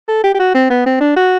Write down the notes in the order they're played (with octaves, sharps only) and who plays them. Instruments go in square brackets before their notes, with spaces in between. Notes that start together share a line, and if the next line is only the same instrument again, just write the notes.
[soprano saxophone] A4
G4
G4
F#4
C4
B3
C4
D4
F#4